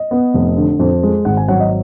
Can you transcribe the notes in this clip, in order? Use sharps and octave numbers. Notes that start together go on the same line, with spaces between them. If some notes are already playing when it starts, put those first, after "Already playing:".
Already playing: D#5
B3
F1
D3
F2
G#3
G#1 F#5
G#5
F#3 F#5
D#5